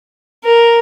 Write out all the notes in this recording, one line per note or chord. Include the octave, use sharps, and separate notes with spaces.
A#4